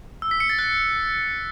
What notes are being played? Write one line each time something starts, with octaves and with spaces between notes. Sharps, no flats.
E6
B6
C#7
A6
F#6